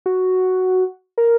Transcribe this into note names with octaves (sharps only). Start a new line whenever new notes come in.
F#4
A#4